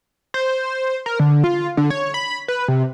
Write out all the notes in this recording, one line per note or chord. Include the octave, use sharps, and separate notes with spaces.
C5
A#4
D3
F4
D3
C#5
B5
B4
C3